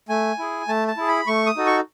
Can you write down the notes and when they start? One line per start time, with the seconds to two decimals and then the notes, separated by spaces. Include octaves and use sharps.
0.09 A3 G#5
0.39 E4 G#4
0.68 A3 A5
0.88 A5
0.97 E4 G#4
1.08 B5
1.27 A3 C#6
1.46 D#6
1.57 D#4 F#4 A4
1.66 C#6